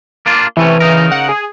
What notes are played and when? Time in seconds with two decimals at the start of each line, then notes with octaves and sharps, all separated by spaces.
0.26 A#3 D4 F4
0.57 C3 E3 A3 C#4
0.80 C#3 D#4 A#4
1.12 F#5
1.29 G#4